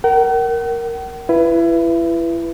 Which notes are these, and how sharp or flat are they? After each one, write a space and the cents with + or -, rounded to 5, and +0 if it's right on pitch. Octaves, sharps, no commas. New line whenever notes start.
A#4 +0 F#5 +45
E4 +30 B4 +0